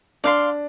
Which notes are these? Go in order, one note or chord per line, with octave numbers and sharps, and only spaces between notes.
D4 D5 F5 C6